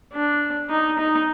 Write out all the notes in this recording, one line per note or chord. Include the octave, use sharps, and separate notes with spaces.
D4
D#4
D#4